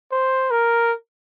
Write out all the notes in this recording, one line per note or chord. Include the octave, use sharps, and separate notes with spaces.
C5
A#4